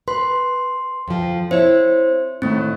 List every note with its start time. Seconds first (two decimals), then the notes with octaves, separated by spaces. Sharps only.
0.08 B4 C6
1.08 F2 F3
1.51 C4 E4 C5 C#5
2.42 A2 D#3 A3 C4